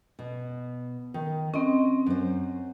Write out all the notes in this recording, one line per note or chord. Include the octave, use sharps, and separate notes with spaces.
B2
D#3
C4 C#4 D#5
F#2 C5